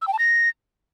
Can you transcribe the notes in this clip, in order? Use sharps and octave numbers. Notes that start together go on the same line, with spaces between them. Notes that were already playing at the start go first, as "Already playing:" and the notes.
E6
G5
A5
A#6